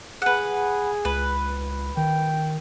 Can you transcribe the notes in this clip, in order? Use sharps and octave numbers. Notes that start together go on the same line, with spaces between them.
G#4 B4 F#5
C#2 B4
D#3 G5